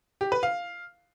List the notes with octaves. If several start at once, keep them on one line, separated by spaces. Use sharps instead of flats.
G4
B4
F5